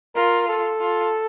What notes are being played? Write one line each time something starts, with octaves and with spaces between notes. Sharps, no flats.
F4 A#4
A4
F4